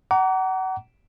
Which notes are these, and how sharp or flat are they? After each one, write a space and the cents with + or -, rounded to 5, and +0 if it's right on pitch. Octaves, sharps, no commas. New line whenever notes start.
F#5 +30 A#5 +0 D6 -35